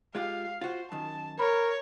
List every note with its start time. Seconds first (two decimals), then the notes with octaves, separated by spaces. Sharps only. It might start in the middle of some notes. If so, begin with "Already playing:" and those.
0.15 G#3 F4 G4 F5
0.61 F4 F#4 C5
0.92 F#2 D#3 A5
1.39 A#4 C#5 B5